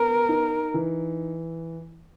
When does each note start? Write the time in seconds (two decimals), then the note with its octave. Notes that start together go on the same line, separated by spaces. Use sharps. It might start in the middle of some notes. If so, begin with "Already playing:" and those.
Already playing: B3 A#4
0.29 D#4
0.74 E3